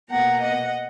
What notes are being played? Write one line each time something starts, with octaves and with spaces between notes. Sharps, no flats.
B2 A#3 F#5 A#5
D#5 F#5